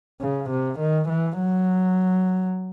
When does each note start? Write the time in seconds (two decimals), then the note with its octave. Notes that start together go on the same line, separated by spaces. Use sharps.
0.21 C#3
0.50 C3
0.80 D#3
1.09 E3
1.39 F#3